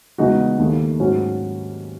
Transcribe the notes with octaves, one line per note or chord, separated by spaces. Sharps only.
E2 C#3 G#3 D#4 F#4
D#2 D#3 A3
G#2 F#3 C#4 F#4